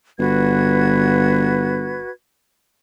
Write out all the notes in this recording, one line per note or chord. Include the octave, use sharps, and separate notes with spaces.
G1 F#4 B4 G#6